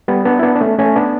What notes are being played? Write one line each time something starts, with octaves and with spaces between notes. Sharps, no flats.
G3 B3
B3 D4
E4
B3 D4
D4
A3 C#4
A3 C#4
B3 D4